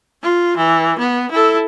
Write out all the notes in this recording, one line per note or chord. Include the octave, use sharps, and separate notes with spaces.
F4
E3
B3
E4 A4